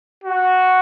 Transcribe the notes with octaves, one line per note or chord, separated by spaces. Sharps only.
F#4